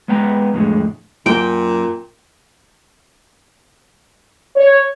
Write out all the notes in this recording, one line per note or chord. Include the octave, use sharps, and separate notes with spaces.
G#3 B3 B4 G5 A#5
F2 A2 D3 F#3 G#3
F#2 A#2 G5
C#5